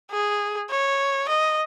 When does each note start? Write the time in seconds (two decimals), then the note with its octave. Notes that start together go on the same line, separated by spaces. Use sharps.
0.11 G#4
0.70 C#5
1.29 D#5